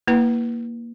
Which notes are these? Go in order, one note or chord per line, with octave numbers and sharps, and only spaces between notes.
A#3 E4 B4